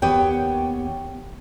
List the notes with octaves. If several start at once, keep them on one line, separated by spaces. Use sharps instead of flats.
D#2 B3 G4 C#5 G5